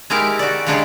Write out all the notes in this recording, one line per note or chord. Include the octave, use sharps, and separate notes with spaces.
G#3 D#4 E4 G4 A#4
F#4 D5
C#3 F#3 G#3 D4 G4 G#4